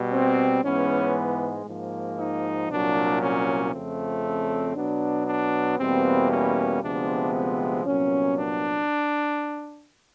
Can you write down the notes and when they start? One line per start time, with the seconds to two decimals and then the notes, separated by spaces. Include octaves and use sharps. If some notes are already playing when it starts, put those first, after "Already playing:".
Already playing: B2 G3
0.12 C4
0.63 G#2 E3 G#3 B3 C#4
1.66 G#2 F3 A#3
2.18 D#4
2.69 C2 A#2 F#3 D4
3.21 C#4
3.73 F2 C#3 F3 A3 C4
4.24 C#4
4.75 B2 F#3 B3 D4
5.27 D4
5.78 E2 B2 G3 A#3 C4
6.30 C#4
6.82 D2 C3 F3 G#3 B3 D4
7.33 C4
7.85 C2 A#2 F#3 B3 C#4
8.36 D4